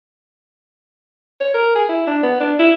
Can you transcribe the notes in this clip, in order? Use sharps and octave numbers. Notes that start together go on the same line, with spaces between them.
C#5
A#4
G#4
E4
D4
B3
D4
E4